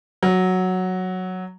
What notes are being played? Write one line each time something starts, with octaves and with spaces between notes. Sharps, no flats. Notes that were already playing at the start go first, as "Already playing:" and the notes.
F#3